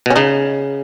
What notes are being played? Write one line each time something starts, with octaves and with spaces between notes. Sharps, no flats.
B2 C#4
C#3 D#4